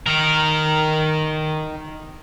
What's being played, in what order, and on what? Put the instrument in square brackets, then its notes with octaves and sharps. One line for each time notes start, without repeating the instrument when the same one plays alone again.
[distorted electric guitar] D#3 A#4